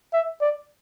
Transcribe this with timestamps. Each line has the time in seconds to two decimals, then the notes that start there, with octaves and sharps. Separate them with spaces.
0.13 E5
0.41 D5